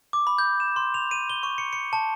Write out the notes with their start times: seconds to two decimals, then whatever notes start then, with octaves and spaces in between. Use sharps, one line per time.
0.13 D6
0.27 B5
0.38 G6
0.60 E7
0.76 C6
0.94 F7
1.11 D#7
1.30 G7
1.43 C#6
1.58 C#7
1.73 C#7
1.93 A5